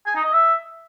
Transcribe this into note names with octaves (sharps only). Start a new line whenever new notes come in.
G#5
D#4
D#5
E5